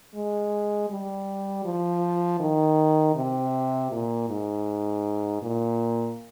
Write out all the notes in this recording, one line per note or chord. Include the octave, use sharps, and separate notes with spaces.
G#3
G3
F3
D#3
C3
A#2
G#2
A#2